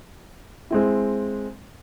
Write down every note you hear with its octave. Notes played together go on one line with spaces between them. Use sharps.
G#3 C4 E4